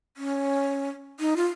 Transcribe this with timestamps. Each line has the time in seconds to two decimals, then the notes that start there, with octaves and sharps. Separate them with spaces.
0.17 C#4
1.20 D#4
1.36 F4